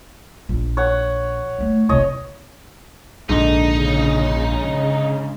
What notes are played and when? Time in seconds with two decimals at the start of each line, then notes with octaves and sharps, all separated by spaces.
0.49 A#1
0.77 C#5 F#5
1.59 D#3 A3
1.89 C2 B2 C#5 D#5
3.29 A#1 G#2 D3 D#4
3.75 C#3